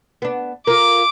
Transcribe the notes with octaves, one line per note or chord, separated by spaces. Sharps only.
B3 D4
F4 A#4 D6